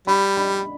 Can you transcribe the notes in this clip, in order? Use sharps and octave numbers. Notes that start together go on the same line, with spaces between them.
G3 B5
B5